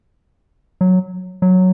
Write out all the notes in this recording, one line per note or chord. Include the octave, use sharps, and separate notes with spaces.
F#3
F#3